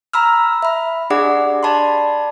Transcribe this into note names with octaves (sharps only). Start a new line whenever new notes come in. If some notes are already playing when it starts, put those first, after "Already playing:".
A#5 B5 E6 F6
E5 B5
D4 G4 G#4 D5 F#5 D6
D5 A5 B5 C6